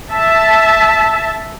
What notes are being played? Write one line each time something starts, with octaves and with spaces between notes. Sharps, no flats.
E5 A5